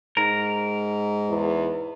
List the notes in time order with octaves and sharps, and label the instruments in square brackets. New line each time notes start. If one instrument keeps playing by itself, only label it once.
[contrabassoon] G#2 [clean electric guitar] A#4
[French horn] E2